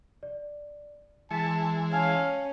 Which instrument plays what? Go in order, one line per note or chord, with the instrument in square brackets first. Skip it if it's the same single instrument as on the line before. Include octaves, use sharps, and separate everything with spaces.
[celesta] D5
[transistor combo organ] E3 G#3 [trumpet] A5 [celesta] B6 C#7
[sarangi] C#4 [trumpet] F5 [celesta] G#5 A5 G#6